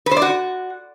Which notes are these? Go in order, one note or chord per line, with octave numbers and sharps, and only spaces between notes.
B4
C5
D5
F#4